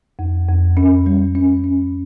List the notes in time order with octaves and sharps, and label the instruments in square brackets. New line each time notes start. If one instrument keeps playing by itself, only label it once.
[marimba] F2
F2
C#4
G3
C#4
C#4